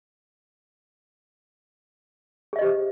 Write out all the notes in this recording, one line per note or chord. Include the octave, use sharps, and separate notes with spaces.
G4 G#4 C5 D#5 E5